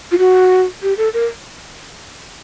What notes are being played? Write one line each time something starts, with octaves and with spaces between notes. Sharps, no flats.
F4
F#4
G4
A4
A#4